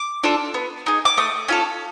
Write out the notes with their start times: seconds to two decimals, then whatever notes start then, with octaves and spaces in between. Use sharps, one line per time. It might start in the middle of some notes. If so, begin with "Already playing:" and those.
Already playing: D6
0.24 D4 F4 A4
0.54 B3
0.86 D#4 G#4
1.05 D6
1.17 A3 D#6
1.48 C#4 F4 A4